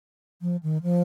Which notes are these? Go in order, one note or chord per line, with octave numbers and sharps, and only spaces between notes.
F3
D#3
F3